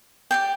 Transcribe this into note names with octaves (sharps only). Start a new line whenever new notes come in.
G4 D5 G5